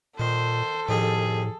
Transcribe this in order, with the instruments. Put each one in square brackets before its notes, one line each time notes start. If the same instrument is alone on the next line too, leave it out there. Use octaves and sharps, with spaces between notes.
[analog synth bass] A#2 [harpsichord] D#3 [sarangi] A4 [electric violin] C5
[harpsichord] F2 D#3 G3 [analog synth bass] A2 [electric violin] G#4